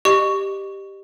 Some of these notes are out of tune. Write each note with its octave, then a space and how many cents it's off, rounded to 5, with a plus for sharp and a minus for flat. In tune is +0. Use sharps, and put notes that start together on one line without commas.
G4 +0 D#5 -35 C#6 +10